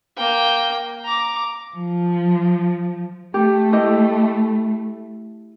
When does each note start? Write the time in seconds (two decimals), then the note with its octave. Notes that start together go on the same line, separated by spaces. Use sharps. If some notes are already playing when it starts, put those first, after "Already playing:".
0.17 A#3 G5
1.05 A#5 D6
1.75 F3
3.34 A3 G4
3.73 E4 G4 D#5